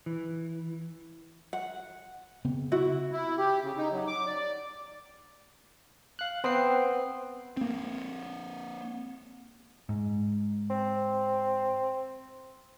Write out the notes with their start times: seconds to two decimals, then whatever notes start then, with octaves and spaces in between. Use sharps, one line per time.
0.06 E3
1.53 F#5
2.45 C#3 B3 C4
2.72 E4 F#4
3.12 E4
3.38 G4
3.62 C#3
3.77 D#4
3.92 F#3
4.07 D6
4.26 D5
6.19 F5 F#6
6.44 B3 C4 C5 G5 C7
7.57 A#3 C4
9.89 G#2
10.70 C4